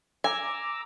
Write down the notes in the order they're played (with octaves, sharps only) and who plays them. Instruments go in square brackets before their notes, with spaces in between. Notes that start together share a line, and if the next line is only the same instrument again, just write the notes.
[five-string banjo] G#5 [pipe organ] A#5 D6 E6